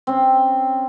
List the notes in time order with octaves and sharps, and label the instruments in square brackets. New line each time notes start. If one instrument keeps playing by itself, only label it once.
[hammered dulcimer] C4 C#4